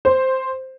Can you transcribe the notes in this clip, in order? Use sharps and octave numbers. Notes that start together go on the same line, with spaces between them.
C5